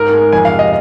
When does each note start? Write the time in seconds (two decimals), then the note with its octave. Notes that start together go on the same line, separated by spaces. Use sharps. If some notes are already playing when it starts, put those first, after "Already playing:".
Already playing: G#2 A#4
0.13 G#3
0.33 F2 G#5
0.45 F5
0.52 C3
0.59 D#5